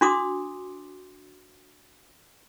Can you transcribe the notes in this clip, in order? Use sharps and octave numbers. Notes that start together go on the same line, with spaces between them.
D4 F#4 C6 D6 D#6